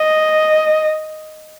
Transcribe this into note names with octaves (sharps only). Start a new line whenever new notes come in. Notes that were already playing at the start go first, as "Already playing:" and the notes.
Already playing: D#5